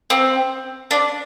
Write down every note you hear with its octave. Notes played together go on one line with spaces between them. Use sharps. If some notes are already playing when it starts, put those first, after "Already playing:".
C4
D4